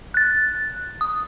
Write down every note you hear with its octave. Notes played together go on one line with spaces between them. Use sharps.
F#6 A6
D#6